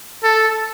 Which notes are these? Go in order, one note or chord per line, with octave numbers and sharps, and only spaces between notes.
A4